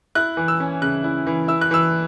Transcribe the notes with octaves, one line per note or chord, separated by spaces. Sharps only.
E4 F#6
E3
E6
C#4
C#3 F#6
E4
E3
E4 E6
F#6
E3 E6